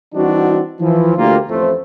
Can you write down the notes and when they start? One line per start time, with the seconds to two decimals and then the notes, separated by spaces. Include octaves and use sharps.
0.15 E3 G3 C4 D4 D#4 F#4
0.80 E3 F3
1.17 D2 A#3 F4 G4
1.49 A1 F2 A2 A3 F4 C5